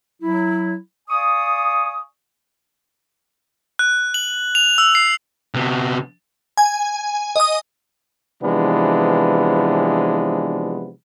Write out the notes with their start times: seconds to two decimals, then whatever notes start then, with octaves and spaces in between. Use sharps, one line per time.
0.22 F#3 E4
1.08 D5 F5 G#5 C#6 D#6
3.79 F#6
4.14 F#7
4.55 F7
4.78 E6
4.95 C7
5.54 C3 B3
6.57 G#5
7.36 D#5 D#6
8.42 C3 E3 F3 G#3 B3 D4